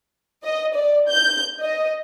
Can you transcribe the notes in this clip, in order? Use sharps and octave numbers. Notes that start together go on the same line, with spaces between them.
D#5
D5
G6
D#5